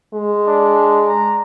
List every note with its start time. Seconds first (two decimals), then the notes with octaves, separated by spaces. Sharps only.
0.14 G#3
0.47 D4
1.08 A#5